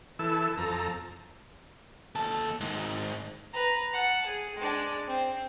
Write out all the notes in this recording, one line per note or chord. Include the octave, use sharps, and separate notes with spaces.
E3 A4 E6
F2 A4 A#5
D#2 A4
G#2 D#3
B4 A#5
F#5 A5
G#4
G#3 D4
C4